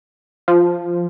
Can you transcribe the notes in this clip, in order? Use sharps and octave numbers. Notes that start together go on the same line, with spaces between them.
F3